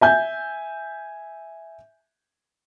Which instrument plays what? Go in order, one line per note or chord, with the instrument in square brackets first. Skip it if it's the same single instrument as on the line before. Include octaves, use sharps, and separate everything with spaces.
[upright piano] E5 G#5 G6